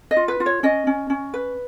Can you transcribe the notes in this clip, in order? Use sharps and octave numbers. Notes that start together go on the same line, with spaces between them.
D#5
F4
B4
F4
C#5
C#4 D#5
C#4
C#4
B4